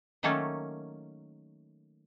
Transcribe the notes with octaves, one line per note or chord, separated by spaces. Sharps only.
D#3 F#3 A3 A#3 C#4 A4